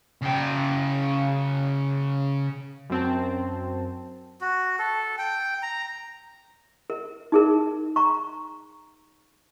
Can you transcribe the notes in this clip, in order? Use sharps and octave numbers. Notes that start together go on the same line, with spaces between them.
C#3 G5
F#2 C4 A5
F#4
A4
G5
A#5
A#4
D#4 G#4 A#4
A#5 C#6